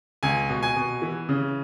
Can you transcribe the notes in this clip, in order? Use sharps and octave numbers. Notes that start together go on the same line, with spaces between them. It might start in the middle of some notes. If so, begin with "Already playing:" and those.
C#2 G#5
B2
G#5
B2
E3
C#3